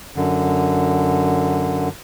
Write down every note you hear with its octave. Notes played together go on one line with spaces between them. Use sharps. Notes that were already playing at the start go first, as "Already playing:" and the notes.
F#2 D3